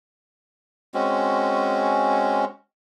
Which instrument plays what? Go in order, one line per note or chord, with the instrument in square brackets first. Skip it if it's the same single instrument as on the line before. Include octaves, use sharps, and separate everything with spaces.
[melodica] G#3 C4 C#4 F#4